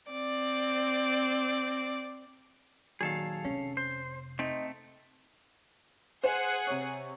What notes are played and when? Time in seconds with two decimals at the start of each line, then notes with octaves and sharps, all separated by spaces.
0.11 C4 D5
3.01 A#2 D#3 F#3 G#4 A4 F5
3.45 F1 C3 C#4
3.77 C5
4.39 A3 C4 D#4
6.24 G#4 C5 F#5
6.67 C3 C#5